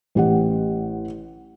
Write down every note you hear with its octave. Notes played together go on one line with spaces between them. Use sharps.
A1 G4 F#5